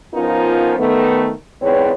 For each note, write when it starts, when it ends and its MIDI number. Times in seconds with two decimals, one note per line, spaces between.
0.14 0.74 53
0.14 0.74 59
0.14 0.74 61
0.14 0.74 63
0.14 0.74 65
0.14 0.74 70
0.78 1.31 51
0.78 1.31 57
0.78 1.31 59
1.61 1.91 40
1.61 1.91 44
1.61 1.91 60
1.61 1.91 71
1.61 1.91 73